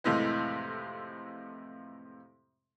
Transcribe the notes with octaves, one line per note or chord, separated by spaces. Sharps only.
F2 A2 C3 E3 G#3